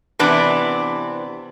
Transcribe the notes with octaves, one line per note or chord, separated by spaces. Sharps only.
C3 E3 B3 D4